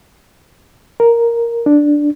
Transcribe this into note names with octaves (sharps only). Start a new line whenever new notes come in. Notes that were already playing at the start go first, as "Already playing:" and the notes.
A#4
D4